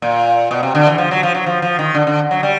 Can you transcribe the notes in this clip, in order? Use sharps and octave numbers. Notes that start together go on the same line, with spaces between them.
A#2
B2
C3
D3
E3
F3
F#3
F3
F#3
F3
F3
D#3
D3
D3
F#3
G3